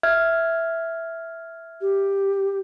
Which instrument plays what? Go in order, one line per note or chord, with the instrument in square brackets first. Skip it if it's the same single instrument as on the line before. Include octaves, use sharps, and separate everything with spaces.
[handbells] E5 F6 G#6
[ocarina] G4